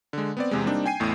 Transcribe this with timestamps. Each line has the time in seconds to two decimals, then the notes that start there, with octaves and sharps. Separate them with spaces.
0.13 D3 G#3
0.37 B3 C4 D5
0.51 E2 C3 G#3
0.65 G3 A#3 C4 D4 D#4
0.86 G5 G#5 C7 D#7
1.00 A1 E2 A2